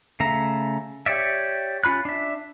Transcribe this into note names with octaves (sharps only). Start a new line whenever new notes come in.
C#3 A3 E5 A#5
G4 C#5 D5 E5
C#4 F4 B5 F#6
D4 E5